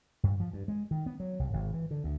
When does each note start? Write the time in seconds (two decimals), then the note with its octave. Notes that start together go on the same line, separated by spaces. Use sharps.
0.23 G2
0.40 F3
0.53 G2
0.68 G#3
0.91 D#3
1.06 B3
1.20 F#3
1.39 C2
1.53 G#1
1.74 E3
1.91 D3
2.04 D2